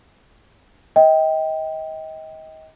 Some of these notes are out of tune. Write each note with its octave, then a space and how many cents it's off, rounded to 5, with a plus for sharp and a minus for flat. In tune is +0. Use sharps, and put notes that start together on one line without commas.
D#5 +30 G5 +0